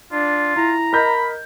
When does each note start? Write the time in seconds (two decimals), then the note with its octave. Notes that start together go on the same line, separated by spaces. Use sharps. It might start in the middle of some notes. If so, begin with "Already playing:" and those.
0.12 D4 F4
0.56 E4 A#5
0.93 A#4 D#5 B5 G6